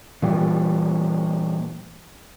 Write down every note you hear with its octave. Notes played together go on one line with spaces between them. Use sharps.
A#2 E3 G3